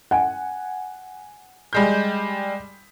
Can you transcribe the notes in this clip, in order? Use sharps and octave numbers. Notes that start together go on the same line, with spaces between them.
F#5 G#5
G3 G#3 G6